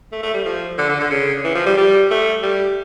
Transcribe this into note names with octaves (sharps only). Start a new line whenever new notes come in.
A3
A3
G3
F3
D3
D3
D3
C#3
E3
F3
G3
G3
A3
G3